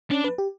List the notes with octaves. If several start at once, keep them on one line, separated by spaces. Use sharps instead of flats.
C#4 D4
B4
G4